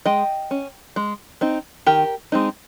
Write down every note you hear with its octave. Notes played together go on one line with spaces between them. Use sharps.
G#3 D#5 G5
C#4
G#3
C4 D#4
D#3 G4 A#4
G#3 C4 D#4